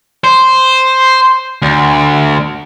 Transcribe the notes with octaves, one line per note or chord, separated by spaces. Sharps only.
C5
D2